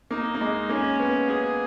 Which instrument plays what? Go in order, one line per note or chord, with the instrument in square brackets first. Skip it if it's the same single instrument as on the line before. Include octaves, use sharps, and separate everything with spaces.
[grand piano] A#3 [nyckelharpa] D#4
[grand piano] A#3
G#3
[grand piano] A#3 [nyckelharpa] C#4
[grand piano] B3
[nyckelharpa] G#4